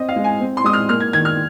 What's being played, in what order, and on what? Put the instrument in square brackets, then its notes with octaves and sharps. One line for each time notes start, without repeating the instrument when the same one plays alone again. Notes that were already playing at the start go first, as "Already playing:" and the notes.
Already playing: [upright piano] C4 D#5
F5
G#3
G#5
C4
C6
G#3 D#6
F6
A#3 F6
G#6
D#3 G#6
F6